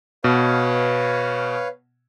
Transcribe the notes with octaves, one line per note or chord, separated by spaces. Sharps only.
B2 B4 C#5 F5